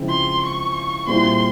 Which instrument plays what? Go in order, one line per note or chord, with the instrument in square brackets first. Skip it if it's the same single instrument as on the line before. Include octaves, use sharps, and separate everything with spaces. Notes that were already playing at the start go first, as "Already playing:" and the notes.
Already playing: [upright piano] C#3 F3 G#3 C4 E4
[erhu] C6
C#6
[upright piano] A#2 G3 C4 E4 G#4 [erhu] C6